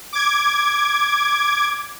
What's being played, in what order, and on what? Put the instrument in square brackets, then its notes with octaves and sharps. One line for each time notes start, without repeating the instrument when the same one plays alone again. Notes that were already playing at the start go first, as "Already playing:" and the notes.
[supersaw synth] D6 G#6